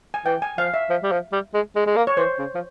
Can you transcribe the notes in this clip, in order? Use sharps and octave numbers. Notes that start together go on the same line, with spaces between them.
G#5
E3 G5
G#5
F3 F5
E5
F3
G3
F3
G3
G#3
G#3
G#3
A#3
C#5
E3 C5
C#3
F3